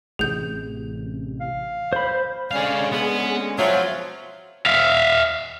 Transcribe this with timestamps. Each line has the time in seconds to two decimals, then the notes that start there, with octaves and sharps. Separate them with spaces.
0.19 A1 C3 G#4 G6
1.41 F5
1.93 C5 B5
2.51 D3 G#3 C#4 G#4 D5 F5
2.92 B3 G#4
3.59 B2 F3 F#3 F4 E5
4.66 E5 F5